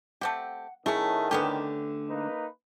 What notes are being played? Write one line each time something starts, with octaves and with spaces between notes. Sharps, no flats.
A3 C4 G4 F#5
A2 D#3 A3 C#4 E4 G#4
D3 A3 B3 C#4 G4
A#3 D#4 B4